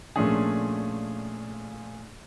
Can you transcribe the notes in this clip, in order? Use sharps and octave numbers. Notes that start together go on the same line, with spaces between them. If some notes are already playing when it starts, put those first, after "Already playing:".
A#2 F3 A3 C#4 D4 G#4